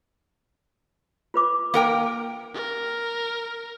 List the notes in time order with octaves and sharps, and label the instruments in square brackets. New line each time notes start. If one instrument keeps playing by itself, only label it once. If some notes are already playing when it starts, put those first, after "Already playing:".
[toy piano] F4 B4 D6
[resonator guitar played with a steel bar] A#3 A#4 G5
[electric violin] A#4